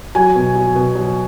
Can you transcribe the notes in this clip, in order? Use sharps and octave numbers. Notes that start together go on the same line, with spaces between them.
F#3 G#5
B2
F#3
B2
F#3